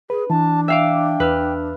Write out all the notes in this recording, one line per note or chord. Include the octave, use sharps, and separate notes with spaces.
G#4 B4
E3 D4 A5
E5 F5 G5 D6
E2 B4 E6 F6